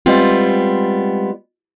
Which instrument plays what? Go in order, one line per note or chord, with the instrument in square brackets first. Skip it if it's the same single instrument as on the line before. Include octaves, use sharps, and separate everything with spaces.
[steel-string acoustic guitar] G3 G#3 B3 C4 F4